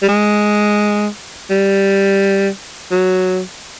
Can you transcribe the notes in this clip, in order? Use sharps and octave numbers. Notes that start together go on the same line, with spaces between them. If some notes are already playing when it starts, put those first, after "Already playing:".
G3
G#3
G3
F#3